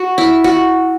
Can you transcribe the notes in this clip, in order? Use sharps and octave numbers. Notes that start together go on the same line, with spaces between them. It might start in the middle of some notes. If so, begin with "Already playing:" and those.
Already playing: F#4
E4
F#4